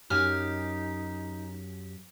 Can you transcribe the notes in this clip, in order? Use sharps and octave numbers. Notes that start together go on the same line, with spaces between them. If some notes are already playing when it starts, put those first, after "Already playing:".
F#2 D#4 G4 G#5 F6